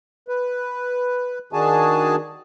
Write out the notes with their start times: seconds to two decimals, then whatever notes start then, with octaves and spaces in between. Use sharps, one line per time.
0.28 B4
1.53 D#3 D4 F#4 G#4 G#5 A5